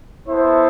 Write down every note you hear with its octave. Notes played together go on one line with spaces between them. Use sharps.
B3 E4 A4 C5 E5